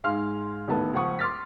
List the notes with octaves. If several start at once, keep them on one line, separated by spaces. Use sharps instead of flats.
G#2 G#3 F5 C6 F6
A1 D#2 A3 B3 A5
C#2 F3 F#5 C#6 D#6
C6 D6 F6 A6 B6